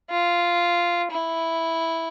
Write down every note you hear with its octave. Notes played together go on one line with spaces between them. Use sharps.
F4
E4